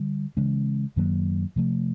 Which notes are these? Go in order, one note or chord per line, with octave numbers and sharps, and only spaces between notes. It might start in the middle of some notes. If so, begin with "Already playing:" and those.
Already playing: D3 G3
C#3 E3 G#3 C#4
F#2 D#3 F#3 A#3
C3 F3 A3